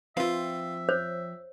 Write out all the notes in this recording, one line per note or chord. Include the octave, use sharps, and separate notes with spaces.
F3 C4 F4 B4 E5 F5
C5 C#5